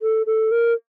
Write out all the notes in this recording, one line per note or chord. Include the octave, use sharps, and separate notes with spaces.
A4
A4
A#4